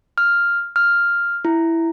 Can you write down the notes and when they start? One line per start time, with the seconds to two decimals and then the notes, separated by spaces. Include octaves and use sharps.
0.18 F6
0.76 F6
1.45 E4